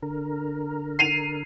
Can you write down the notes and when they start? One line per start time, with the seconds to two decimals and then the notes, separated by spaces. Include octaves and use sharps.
0.02 D3 A#4
0.99 C7 D#7 F7